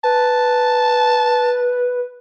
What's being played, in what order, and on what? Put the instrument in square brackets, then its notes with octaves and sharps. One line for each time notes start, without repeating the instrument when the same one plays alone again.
[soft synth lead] B4 [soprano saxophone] A5